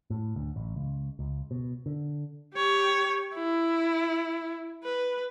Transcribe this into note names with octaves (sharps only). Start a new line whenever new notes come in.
A2
D2
A1
C#2
C#2
B2
D3
G4 C#5
E4
B4